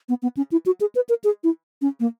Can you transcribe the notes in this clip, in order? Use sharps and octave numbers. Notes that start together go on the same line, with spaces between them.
B3
B3
C#4
E4
F#4
G#4
B4
A#4
G#4
E4
C#4
A#3